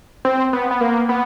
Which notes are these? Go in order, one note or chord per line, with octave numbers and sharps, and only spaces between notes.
C4
B3
B3
A#3
B3